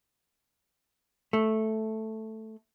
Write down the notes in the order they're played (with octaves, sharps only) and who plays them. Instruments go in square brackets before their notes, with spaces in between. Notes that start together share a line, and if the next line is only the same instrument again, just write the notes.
[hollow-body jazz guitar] A3